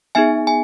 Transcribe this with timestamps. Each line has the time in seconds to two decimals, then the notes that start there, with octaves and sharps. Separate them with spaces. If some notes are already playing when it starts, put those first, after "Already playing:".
0.15 B3 D#4 G#4 E5 G#5
0.47 G#5